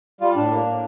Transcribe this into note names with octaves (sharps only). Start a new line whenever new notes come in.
G3 F4
A2 D4
A#3
A2